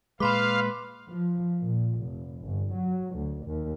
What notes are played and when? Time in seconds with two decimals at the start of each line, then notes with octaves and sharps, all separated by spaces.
0.20 A#2 G#3 B4 F5 B5 C6 D6
1.09 F3
1.60 A#2
1.99 F1
2.43 G1
2.74 F#3
3.16 D2
3.46 D#2